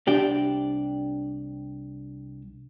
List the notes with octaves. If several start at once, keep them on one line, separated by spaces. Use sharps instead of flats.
C2 D4 G4